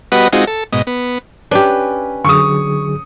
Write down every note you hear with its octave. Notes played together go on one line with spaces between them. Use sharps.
G3 B3 F#4 B4 D#5 F#5
G#3 C4 D#4 F4 F#4
A4
G#2 B2 D#5
B3
C#4 D4 G4 B4
D3 F#3 G#4 C#6 D#6